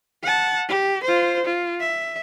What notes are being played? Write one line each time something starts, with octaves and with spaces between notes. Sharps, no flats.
F#5 A5
G4
F4 C5
F4
E5